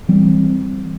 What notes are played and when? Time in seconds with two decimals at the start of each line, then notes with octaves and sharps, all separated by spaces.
0.08 E3 G3 C4